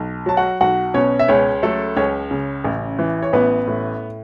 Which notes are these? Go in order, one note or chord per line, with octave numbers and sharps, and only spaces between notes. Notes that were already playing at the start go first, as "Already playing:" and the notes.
Already playing: B1
F#3 A5
F#4 F#5
B1 F#4 F#5
B2 C#4 C#5
E5
C#2 C#4 C#5
F#3 A3 A4
C#2 C#4 C#5
C#3
A1
E3
C#5
A1 B3 B4
A2